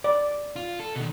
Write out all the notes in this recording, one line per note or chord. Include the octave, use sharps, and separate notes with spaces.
D5
F4
A4
B2 D#3